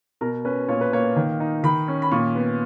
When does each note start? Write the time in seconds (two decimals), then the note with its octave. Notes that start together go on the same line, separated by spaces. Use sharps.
0.21 B2 A#4
0.45 C#4 B4
0.68 A#2 C#5
0.81 B4
0.93 A#3 C#5
1.16 D#3
1.40 D#4
1.63 D#3 B5
1.88 C#4
2.02 B5
2.11 A#2 C#6
2.35 B3